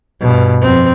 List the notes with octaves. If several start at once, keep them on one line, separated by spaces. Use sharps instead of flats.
G2 B2
F2 C4